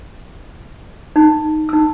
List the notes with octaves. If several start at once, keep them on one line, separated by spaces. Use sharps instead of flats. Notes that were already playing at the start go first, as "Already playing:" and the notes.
D#4
D#4 E6